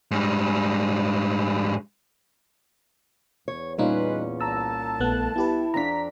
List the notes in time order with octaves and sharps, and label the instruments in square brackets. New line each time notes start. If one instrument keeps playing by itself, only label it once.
[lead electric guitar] G#2 G3
[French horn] E2 [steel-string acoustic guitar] C#5
[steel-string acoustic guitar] A#2 C#4 [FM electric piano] G3 D#4 [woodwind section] F4 G#4 B4
[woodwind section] C2 A5 [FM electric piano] A#5 E6
[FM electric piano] A#1 B3 F#6 [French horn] A3
[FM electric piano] B3 G4 B4 [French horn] E4
[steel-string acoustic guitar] F2 D4 [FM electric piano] A#5 B6